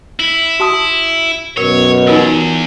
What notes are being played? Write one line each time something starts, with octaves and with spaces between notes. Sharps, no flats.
E4
F#4 A5 D#6
F#2 B2 A#4 C#5
E2 D#4 F4 A#4